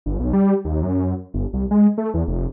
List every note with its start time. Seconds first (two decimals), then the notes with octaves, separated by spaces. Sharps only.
0.06 G1
0.20 B1
0.33 G3
0.65 D#2
0.83 F#2
1.34 G1
1.53 C2
1.71 G#3
1.98 A3
2.14 E2
2.28 F1